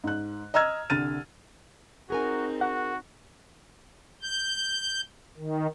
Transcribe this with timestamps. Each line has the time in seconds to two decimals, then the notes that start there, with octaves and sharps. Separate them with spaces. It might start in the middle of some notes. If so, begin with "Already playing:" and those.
0.04 G#2 F#6
0.54 D#5 A#5 E6 F6 G#6
0.90 C2 D3 F6 A6 D#7
2.10 C4 D#4 F#4 G#4 A#4 G#5
2.61 F#4 F#5
4.22 G6
5.37 D#3